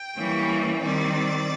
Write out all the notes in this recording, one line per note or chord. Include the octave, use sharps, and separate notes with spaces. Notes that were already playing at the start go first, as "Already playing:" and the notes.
Already playing: G5
E3 G3 A#3 C#4
D#3 G3 C4 D5